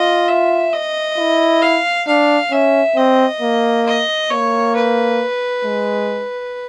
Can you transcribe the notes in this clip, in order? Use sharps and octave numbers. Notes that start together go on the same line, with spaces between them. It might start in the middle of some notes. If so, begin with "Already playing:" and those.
Already playing: F4 D#5
E5
D#5
E4
F5
D4 F5
C#4 E5
C4 D#5
A#3
D#5
A#3 C#5
B4
G#3